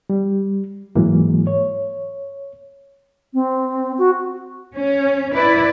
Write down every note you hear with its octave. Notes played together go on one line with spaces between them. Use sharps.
G3
G#2 E3 F#3 G#3 A#3
C#5
C4
F#4
C#4
E4 B4 D5